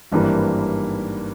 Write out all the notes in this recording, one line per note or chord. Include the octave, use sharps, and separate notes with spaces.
G#1 G2 E3 G3 A#3